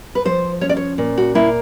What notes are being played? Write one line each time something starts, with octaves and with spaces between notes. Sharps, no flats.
B4
F3 C5
C#4 C#5
D5
C#5
A#2
F#4
A#3 E4